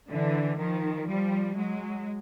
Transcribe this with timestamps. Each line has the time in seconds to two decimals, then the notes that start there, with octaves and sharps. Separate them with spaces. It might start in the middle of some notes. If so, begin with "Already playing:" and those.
0.11 D3 E3
0.59 D#3 F3
1.07 F3 G3
1.56 F#3 G#3